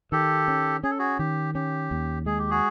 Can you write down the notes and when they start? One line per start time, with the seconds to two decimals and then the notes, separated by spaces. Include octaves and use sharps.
0.12 D#3 G4 A4
0.48 C#4
0.84 C#4 G#4
0.91 A4
0.99 F#4 G#4
1.19 D#3 G4
1.55 C#4 G4
1.91 D#2
2.26 G#3 G#4
2.39 G4
2.50 F#4 G#4